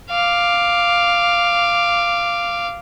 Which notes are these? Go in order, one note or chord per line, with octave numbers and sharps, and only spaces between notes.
F5 D6